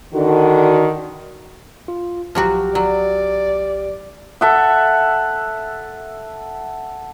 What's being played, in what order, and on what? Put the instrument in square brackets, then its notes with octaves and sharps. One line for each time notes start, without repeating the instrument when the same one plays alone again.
[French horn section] D3 D#3 F#4
[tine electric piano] F4
[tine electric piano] B1 G4 F6 [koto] F3 F#3 F#4
[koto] F#3 [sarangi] D5
[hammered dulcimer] A4 E5 F#5